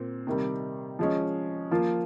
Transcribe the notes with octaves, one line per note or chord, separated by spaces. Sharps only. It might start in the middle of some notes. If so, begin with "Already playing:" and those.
Already playing: A#2 C4
C3 D#3 G3
F3 G#3 C#4
F3 A#3 F4